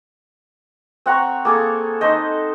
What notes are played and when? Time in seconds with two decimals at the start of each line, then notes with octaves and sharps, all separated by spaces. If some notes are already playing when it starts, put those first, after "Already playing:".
1.06 C4 F#5 A#5 C#6
1.45 A#3 G#4 A4
2.01 D#4 A4 C5 D#5